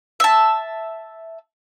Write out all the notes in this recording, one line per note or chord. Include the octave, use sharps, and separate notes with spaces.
E5 A5